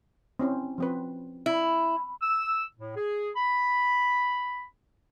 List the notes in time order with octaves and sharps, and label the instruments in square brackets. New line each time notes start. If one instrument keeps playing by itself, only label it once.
[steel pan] C4 C#4 E4
F3 C4 B4
[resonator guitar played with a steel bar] E4
[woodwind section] E6
A2
G#4
B5